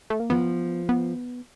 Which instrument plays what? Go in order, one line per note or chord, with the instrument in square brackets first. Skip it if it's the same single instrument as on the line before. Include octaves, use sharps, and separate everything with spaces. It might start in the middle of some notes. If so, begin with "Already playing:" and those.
[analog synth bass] A3
A#3
[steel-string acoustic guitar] F3 [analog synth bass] B3
[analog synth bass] B3